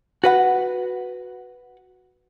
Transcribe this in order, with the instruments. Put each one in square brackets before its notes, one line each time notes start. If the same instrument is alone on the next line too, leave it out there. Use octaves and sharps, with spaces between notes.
[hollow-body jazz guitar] F#4 B4 F#5